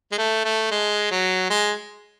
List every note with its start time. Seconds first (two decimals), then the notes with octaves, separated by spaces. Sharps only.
0.12 G#3
0.18 A3
0.44 A3
0.71 G#3
1.11 F#3
1.50 G#3